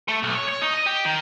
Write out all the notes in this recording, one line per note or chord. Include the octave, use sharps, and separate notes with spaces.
A3
B1
C#5
C#5
D#4
D#5
G4
D#3